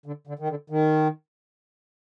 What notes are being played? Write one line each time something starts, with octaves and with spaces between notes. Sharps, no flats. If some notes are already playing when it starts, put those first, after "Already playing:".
D3
D3
D#3
D3
D#3